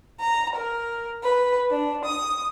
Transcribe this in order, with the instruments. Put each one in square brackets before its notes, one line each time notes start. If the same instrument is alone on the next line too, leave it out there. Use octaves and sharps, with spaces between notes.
[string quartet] A#5
A#4
B4
D4
D#6